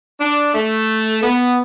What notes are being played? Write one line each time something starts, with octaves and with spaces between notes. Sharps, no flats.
D4
A3
B3